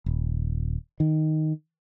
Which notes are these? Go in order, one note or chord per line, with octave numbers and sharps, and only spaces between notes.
D#1
D#3